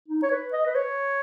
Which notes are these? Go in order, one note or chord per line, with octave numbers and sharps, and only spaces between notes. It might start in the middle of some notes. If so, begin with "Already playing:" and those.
D#4
C#5
B4
D#5
B4
C#5